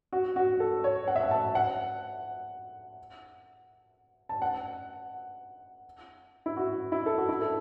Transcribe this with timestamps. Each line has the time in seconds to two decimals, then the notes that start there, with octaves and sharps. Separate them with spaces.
0.13 F#4
0.36 F#4
0.60 A4
0.84 C#5
1.08 F#5
1.16 E5
1.23 F#5
1.31 A5
1.55 F#5
4.29 A5
4.42 F#5
6.46 E4
6.57 F#4
6.92 E4
7.06 A4
7.18 F#4
7.29 E4
7.42 A4